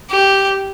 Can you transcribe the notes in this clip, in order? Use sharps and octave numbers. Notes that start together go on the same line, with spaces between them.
G4